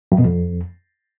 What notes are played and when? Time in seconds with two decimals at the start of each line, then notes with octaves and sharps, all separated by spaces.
0.12 F#2
0.18 B2
0.25 F2